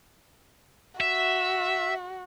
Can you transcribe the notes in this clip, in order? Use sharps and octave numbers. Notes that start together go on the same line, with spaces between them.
F#4 E5